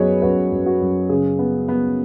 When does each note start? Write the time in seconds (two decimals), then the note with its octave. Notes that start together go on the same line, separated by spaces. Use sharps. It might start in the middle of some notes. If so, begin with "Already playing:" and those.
Already playing: F#2 F#3 B3 G#4 B4 C#5 D#5
0.22 F#2 F#4 B4
0.52 F#2
0.66 F#4
0.81 F#2
1.09 C#3 G#4
1.39 B3
1.69 B3